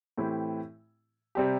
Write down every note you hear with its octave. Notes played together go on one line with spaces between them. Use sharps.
A2 E3 C4 E4 G4
C3 G3 C4 G4